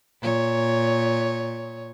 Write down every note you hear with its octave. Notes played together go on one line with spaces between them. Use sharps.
A#2 C#5